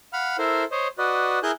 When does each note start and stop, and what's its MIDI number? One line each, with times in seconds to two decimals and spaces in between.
0.13 0.37 77
0.13 0.37 78
0.13 0.37 83
0.13 0.37 89
0.38 0.64 64
0.38 0.64 69
0.38 0.64 70
0.38 0.64 72
0.71 0.88 72
0.71 0.88 73
0.71 0.88 75
0.98 1.39 66
0.98 1.39 71
0.98 1.39 74
0.98 1.39 75
1.43 1.51 64
1.43 1.51 68
1.43 1.51 70
1.43 1.51 80
1.43 1.51 90
1.43 1.51 91